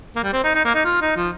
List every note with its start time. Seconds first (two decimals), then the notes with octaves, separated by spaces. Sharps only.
0.15 A#3
0.23 G3
0.33 C4
0.44 D#4
0.55 D#4
0.65 A#3
0.75 D#4
0.85 F4
1.01 D#4
1.16 F3